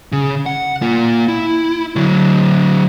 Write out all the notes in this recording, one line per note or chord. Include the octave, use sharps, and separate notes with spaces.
C#3
F#5
A#3 F4
E4
D3 F#3